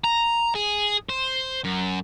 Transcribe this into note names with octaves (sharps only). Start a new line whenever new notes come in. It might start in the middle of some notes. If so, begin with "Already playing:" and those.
A#5
G#4
C5
F#2